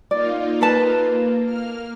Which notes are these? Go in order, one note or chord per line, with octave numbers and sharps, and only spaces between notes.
A#3 D#4 F4 D5
A4 B4 A5
A#3
A#3 F6